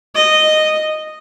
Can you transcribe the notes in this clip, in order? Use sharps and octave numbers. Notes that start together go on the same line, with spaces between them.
D#5